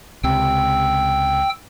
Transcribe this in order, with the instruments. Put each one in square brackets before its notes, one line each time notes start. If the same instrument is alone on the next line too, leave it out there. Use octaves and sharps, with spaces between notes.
[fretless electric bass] C#2 C3 [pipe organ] G5 E6